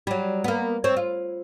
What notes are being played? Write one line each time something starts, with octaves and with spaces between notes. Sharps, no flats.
F#3 G3
A#3 B3
C4 C#5
F4